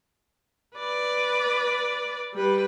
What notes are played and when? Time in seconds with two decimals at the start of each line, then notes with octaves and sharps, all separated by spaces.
0.77 B4 D5
2.34 G3 B4